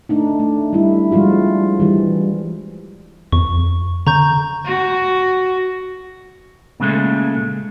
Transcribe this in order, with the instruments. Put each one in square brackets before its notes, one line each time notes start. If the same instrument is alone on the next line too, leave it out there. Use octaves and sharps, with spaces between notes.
[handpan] A3 D4 D#4
A3
G3 E4
F3 G3 G#3 F4 F#4
E3 G3
[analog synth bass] F2 [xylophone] C#6
[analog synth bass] D3 [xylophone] A#5 C#6 G6
[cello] F#4
[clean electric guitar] A#2 C#3 G#3 A3